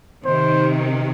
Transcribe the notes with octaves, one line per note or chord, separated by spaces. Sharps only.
C3 D#3 C5